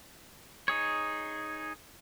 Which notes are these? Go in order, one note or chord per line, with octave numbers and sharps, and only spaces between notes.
D#4 G#4 C#5